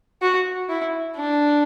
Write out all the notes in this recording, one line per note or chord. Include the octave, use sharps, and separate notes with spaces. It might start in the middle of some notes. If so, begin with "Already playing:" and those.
F#4
E4
D4